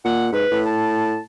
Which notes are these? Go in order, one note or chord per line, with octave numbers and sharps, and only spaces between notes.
A#2 F#5
G#2 B4
A2
A5